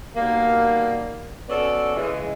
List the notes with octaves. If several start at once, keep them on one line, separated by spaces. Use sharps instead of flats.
B2 D#3 G3 A#3
B3 C#4 F#4 A4 C#5 D5
C#3 E3 G#3